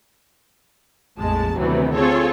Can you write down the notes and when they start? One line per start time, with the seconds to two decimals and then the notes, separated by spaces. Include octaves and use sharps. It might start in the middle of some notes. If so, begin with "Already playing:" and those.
1.19 A#1 F2 A2 G#3 A5
1.58 D2 C3 D#3 E3 F#3 B3
1.95 C4 F4 G#4 A4 C#5